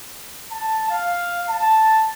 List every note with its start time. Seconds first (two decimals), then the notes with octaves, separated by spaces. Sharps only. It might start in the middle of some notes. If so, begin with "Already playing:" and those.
0.52 A5
0.90 F5
1.50 A5